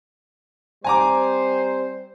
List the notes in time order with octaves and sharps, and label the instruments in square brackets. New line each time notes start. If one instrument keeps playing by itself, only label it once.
[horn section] G3 C4 C5 [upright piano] G#5 A#5 D6